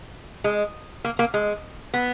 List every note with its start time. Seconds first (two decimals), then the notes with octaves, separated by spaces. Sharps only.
0.44 G#3
1.05 A#3
1.19 A#3
1.34 G#3
1.94 B3